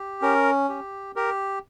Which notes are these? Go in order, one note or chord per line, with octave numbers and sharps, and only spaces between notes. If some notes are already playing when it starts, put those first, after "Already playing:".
Already playing: G4
C#4 A#4
G4
G4 A#4